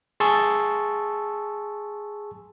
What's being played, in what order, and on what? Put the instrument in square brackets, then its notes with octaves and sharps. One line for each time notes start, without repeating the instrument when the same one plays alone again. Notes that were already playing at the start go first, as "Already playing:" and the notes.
[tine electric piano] G#4 A5 C6 C#6 E6